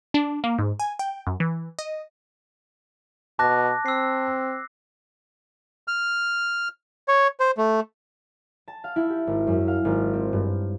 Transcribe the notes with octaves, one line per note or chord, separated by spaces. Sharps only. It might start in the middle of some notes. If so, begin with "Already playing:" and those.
D4
A#3
G#2
G#5
G5
F#2
E3
D#5
B2 A5 D6 F#6 A#6
C4 E6 C7
F6
C#5
C5
A3
A5
F5
E4
G4
G#1
F#2
F5
G#1
C4
G2